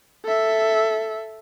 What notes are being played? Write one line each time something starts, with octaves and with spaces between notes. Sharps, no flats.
A4 E5